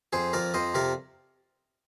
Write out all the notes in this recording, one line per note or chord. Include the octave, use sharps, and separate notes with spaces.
F2 G#4 C5
F2 A#4 D5
F2 C5 D#5
C3 A#4 D5